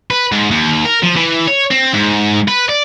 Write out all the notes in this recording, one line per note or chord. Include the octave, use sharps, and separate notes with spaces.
B4
G#2
D#2
A#4
F3
E3
C#5
C4
G#2
B4
D5